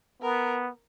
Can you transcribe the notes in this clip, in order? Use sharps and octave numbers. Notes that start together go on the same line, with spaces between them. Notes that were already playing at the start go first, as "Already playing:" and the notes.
B3 A#4